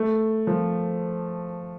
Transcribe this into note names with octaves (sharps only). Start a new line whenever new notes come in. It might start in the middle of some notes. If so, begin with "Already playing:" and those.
Already playing: A3
F3